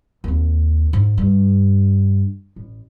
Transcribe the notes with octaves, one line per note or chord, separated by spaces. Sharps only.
D#2 C4
G#2
G2
A1